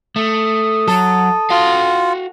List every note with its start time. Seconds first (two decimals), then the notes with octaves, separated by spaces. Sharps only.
0.16 A3 D#6
0.88 F#3 A4
1.50 F4 F#4 F5